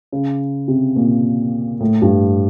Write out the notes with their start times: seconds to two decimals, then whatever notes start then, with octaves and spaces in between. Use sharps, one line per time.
0.12 C#3
0.68 C3
0.96 A#2
1.80 A2
2.02 G2